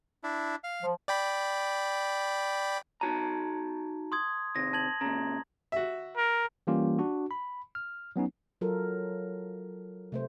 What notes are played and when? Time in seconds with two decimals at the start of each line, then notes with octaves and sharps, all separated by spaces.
0.24 D4 E4
0.64 F5
0.83 F3
1.08 D5 G5 B5
3.01 D#4 F#4 A5 A#5
4.12 C6 D#6 G#6
4.56 C3 D#3 A#6
4.73 A5 G#6 F#7
5.01 A#2 C#3 A#5
5.72 F#4 E5
6.17 A#4
6.67 E3 G3 A#3 C#4 F4 G4
6.99 D4 F#4
7.31 B5
7.75 F6
8.16 F#3 B3 C#4 D#4
8.61 F#3 F4 A4 A#4
10.12 C3 A3 C5